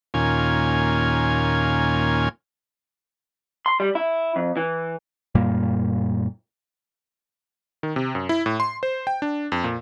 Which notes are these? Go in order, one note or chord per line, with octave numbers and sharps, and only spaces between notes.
D#2 A#2 C#4 F4 G#5
C6
G3
E4
F2
E3
F#2 A#2 G3 A#3
D#3
C3
F#2
E4
A2
C6
C5
G5
D4
F2
A#2